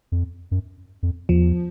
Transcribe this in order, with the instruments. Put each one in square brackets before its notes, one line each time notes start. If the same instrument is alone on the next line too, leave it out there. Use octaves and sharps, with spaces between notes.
[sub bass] F2
F#2
F2
[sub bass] E2 [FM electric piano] F3